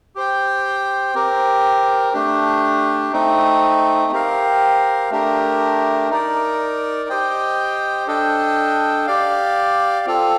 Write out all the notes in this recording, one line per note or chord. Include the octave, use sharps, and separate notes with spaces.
G4 C5 G5
C4 G4 A#4
A3 D4 G4
A3 C4 D#4
C4 G4 A#4 F5
A3 D4 G4 A#4
D#4 A#4 D5
G4 C5 D#5 G5
D4 A4 D#5 G5
G4 D5 F5
C4 F4 A4